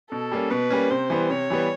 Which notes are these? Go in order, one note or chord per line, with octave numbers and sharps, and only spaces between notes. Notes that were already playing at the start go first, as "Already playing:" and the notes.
B2 A4
G3 A#3 C#4
B2 B4
G3 A#3 C#4
C3 C5
E3 G3 B3
C3 C#5
E3 G3 B3